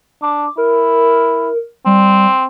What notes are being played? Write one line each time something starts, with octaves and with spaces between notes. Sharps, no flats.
D4 D6
E4 A#4
G3 C4